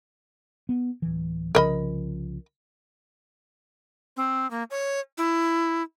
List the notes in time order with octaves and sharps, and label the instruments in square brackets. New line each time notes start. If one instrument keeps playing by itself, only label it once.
[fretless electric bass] B3
D1 E3
[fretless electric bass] C2 C#3 F3 [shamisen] A#4 D#5 B5
[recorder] C4
A#3
C#5
E4